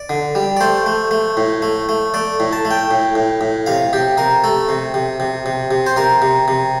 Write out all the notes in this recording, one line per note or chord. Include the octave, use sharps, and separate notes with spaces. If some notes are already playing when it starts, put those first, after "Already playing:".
Already playing: D5
D3
G3
D5
A3 C5
A3
A3
A2
A3
A3
A3 D5
A2
A5
A3
G5
A2
A2
A2
C3 F5
C3 G4
C3 A#4
A3 A4
C3
C3
C3
C3
C3
C5
C3 A#4
C3
C3